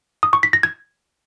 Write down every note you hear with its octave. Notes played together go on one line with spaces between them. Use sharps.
D#6
C#6
B6
A#6
G#6